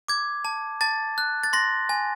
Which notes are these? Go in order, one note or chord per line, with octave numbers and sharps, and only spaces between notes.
D6 G#6
A5
A5 A6
F#6
A6
C6 A#6
G#5